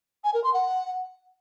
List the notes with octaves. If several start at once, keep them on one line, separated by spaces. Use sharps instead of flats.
G#5
A#4
C6
F#5